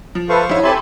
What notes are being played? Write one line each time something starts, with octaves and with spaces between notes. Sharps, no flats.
F3
A4 B4 C5 E5 F5 C#6
F2 D3 E4 C#5
C4 G4 A4 E5 G#5 A5 B5 C6